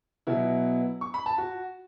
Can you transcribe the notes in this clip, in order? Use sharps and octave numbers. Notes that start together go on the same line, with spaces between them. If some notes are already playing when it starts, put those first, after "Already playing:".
B2 F#3 B3 E4
C#6
B5
A5
F#4